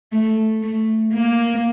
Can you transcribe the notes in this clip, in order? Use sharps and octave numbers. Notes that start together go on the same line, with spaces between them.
A3
A3
A#3